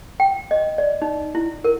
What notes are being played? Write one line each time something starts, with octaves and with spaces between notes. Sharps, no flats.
G5
D#5
D5
D#4
E4
A#4